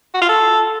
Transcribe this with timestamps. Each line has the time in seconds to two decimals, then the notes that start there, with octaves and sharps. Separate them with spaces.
0.14 F#4
0.22 F4
0.29 A4